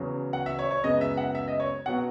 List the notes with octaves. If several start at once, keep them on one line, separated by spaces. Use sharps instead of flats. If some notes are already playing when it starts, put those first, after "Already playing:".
Already playing: E2 C#3 F#3
F#5
E5
C#5
C#5
F#2 C#3 G#3 B3 D#5
E5
F#5
E5
D#5
C#5
B2 F#3 C#4 F#5